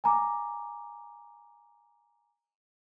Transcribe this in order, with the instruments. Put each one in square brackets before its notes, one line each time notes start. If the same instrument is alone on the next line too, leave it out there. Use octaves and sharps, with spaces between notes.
[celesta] G#5 A#5 D6